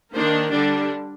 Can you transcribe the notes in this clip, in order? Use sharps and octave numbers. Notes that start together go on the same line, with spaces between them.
D#3 A#3 D4 C5
D3 G3 D4 D5